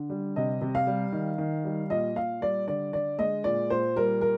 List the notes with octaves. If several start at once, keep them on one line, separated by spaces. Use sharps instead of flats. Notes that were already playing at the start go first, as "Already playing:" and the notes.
Already playing: D3
G3
C3 D#5
C3
F5
G3
D#3
D#3
G3
A#2 D#5
A#2 F5
G3 D5
D3 D5
D3 D5
G#3 D#5
A#2 D5
A#2 C5
G3 A#4
A#4